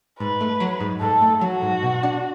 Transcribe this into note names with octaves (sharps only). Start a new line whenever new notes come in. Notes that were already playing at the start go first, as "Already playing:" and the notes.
G#2 B4
A3
F#3
G#2
G#2 A4
A3
F#3 F#4
G#2
B2
D4